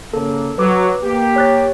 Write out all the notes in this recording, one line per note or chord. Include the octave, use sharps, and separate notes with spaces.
C#3 A#3 A4
F#3 B4 D6
A#3 G4
C#5 F#6 A6